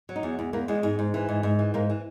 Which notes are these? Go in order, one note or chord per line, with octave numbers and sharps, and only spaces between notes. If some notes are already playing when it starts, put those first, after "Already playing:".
F#3
D#4
E2
E2
E2 A#3
E2 G#3
G#2
G#2
E3
G#2
G#2
E3
G#2 A#3
E3